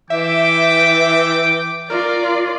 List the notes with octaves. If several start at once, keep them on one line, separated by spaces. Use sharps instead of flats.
E3 E5 G5 D6
F4 A#4 D5